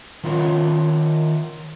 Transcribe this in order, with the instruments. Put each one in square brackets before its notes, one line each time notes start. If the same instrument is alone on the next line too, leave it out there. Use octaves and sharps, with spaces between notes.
[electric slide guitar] D#3 F4 A#4 C#5